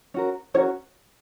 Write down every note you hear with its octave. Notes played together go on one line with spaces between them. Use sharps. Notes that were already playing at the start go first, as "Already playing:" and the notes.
C#4 F#4 A#4
C#4 F#4 A#4 C#5